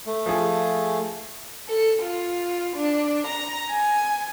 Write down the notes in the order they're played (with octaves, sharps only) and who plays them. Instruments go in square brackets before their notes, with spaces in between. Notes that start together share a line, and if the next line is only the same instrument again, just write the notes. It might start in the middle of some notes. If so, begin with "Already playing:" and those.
[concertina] A3
[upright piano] F3 G#4
[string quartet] A4
F4
D4
A#5
G#5